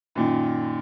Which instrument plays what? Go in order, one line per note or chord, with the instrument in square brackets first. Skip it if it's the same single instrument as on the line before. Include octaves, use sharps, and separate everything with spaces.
[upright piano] F#2 A#2 D#3